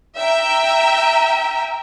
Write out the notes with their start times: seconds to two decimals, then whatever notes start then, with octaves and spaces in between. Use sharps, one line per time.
0.17 E5 G5 A#5